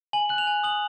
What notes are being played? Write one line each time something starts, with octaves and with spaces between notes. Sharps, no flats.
G#5 F#7
F#6 F#7
F7
G#5
D#6 F#7